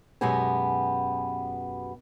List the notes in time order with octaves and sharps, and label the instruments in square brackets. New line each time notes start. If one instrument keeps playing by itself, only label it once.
[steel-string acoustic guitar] F#2 B2 G#3 B3 G4 G#5